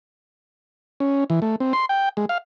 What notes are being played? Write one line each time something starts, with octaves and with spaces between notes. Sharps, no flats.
C#4
E3
A3
C4
C6
G5
G#3
F5